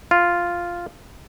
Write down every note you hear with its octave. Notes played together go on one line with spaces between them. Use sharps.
F4